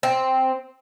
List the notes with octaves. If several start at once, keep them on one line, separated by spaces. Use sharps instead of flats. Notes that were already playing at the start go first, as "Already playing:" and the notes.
C4